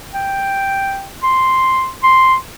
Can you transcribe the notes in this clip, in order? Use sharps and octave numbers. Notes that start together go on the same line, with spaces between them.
G5
C6
C6